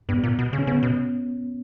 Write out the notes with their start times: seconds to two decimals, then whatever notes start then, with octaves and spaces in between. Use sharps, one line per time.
0.09 G2 B3
0.23 A#2
0.39 B2
0.53 C#3
0.59 C#4
0.67 C#3 B3
0.83 B2